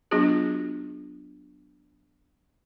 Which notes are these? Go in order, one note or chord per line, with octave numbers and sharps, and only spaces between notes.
F#3 B3 D4 F4 F#4 G#4